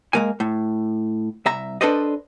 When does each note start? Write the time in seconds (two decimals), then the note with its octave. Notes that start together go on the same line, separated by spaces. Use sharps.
0.13 G#3 A#3 G#5
0.40 A2
1.46 C2 E5 A#5
1.81 D4 A4 B4 C5 D5 D#5